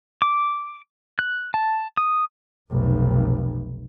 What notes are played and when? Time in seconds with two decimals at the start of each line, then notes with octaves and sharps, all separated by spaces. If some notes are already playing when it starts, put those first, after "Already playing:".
0.22 D6
1.19 F#6
1.54 A5
1.97 D#6
2.71 F1 B1